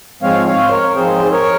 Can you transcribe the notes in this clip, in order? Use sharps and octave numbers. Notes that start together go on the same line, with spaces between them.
G#2 F3 G#3 C4 C#5 F5
C#5 F5
C5
A#4 C#5
G#2 F3 G#3 C4 G#4 C5
A#4 C#5